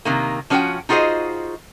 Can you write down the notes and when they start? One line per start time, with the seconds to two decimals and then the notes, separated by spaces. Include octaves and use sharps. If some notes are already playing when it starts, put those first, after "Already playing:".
0.05 C3 D#3 A#3
0.50 F3 C#4 F#4 C#5 F#5 G5
0.89 D#4 F4 F#4 G#4 C5 D#5